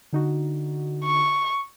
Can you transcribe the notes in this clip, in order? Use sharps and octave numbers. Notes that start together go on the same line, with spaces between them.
D3 D#4 F#4
C#6